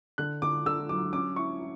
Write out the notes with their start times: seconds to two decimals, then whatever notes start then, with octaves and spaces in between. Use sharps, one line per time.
0.18 D3 F#6
0.42 D3 D6
0.66 D3 E6
0.89 F#3 D6
1.13 C#4 D6
1.36 E4 C#6
1.61 E4